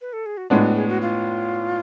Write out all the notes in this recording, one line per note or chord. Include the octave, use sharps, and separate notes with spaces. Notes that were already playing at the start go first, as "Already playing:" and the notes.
B4
A4
G#4
F#4
A2 G#3 B3 D4 F4
F#4
G#4
F#4
F4